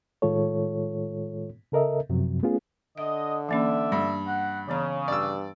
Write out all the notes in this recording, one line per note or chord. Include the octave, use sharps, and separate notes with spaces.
A2 D#3 G#3 F4 A4 C#5
C#3 A4 A#4 D#5 E5
F#2 C3 F3 F#3
A3 B3 C#4 F4 G#4
D3 D#5 E5
E3 A#3 C#4 D5 E5
G2 D4
F#5
C#3 E3 B3 C#5 A#5
G2 D5 E6